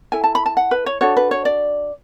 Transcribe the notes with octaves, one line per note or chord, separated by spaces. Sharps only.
E4 A4 G#5
A5
B5
A5
F#5
B4
C#5
D4 F#4 A4 C#5
B4
C#5
D5